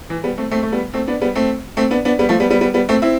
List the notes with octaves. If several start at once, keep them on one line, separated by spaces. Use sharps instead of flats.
E3
G3 B3
A3 C4
A3 C4
A3
G3 B3
A3 C4
B3 D4
G3 B3
A3 C4
A3 C4
B3 D4
B3 D4
G3 B3
F3 A3
G3 B3
G3 B3
G3 B3
G3 B3
A3 C4
C4 E4